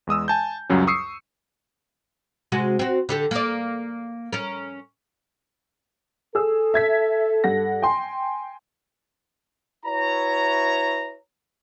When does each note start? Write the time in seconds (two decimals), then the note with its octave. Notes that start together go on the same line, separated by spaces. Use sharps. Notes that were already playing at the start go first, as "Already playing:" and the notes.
0.07 E2 G#3 D#6 E6
0.28 G#5 A5 G6
0.69 C#2 F#2 F#3 G3 C#4
0.87 C#6 D#6 E6 C7 C#7
2.52 C3 G#3 F#4
2.79 C4 F#4
3.09 D3 G4 A4
3.31 A#3 D5
4.33 C#4 A#4
6.35 G#4 A4 E6
6.74 E5 G#6 B6
7.44 G2 F#5 A#6
7.82 G5 G#5 C6
9.86 E4 F#4 B4 C#5 E5 A#5